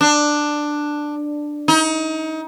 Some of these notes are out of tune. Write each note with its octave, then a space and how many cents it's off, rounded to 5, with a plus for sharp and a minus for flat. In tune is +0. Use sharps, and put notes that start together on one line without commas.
D4 +10
D#4 +30